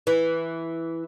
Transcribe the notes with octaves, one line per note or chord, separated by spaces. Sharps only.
E3